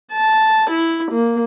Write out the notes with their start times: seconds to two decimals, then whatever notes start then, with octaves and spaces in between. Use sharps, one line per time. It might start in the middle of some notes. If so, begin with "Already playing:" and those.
0.12 A5
0.71 E4
1.12 A#3